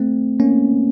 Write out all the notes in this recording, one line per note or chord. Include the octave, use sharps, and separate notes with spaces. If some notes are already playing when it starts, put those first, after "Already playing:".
Already playing: A3 C4
A#3 C#4